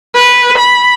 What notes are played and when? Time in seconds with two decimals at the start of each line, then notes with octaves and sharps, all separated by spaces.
0.15 B4
0.58 B5